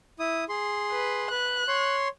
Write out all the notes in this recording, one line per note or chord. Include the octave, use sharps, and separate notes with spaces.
E4 D#6
G#4 C6
B4
B4 F#6
C#5 C6